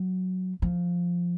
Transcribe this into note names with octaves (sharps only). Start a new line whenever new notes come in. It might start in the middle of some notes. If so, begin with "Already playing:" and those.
Already playing: F#3
F3